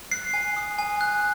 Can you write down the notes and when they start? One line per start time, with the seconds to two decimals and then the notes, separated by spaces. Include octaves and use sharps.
0.11 F#6 C7
0.34 G#5
0.56 D#6
0.78 G#5
1.01 F#6